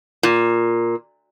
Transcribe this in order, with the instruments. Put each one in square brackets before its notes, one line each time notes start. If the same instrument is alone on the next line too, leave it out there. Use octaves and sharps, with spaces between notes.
[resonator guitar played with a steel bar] A#2